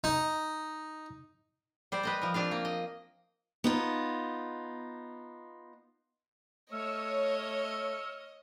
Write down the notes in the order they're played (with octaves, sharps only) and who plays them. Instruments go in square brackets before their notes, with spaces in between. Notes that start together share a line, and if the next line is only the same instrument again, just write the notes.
[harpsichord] D#4
[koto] G3 C5 D5
B4 D#5 A#5
F3 A#4
C4 D4 F4 F5
A#3
D#5
[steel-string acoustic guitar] B3 D#4 F4
[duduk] A3 [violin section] C#5 [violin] D#5 [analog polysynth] E6 F6 C#7